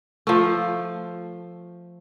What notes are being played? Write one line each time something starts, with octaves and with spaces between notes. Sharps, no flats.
F3 A3